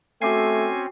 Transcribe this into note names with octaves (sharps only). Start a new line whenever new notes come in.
A3 C4 C#4 F#4 G#5 D6 C7